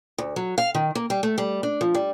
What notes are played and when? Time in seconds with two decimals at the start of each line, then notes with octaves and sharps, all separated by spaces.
0.18 D2
0.36 F#3
0.58 F5
0.75 D#3
0.95 A#3
1.10 G3
1.23 A3
1.38 G3
1.63 D4
1.81 F3
1.95 G3